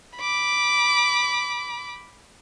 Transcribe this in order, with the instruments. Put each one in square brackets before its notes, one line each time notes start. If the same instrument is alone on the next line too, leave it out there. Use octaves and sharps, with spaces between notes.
[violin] B5 D6